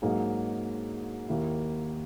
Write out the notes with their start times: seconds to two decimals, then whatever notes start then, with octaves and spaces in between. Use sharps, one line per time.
0.02 G#2 F#3 A#3 D#4 G#4
1.28 D#2 D#3 A#3 E4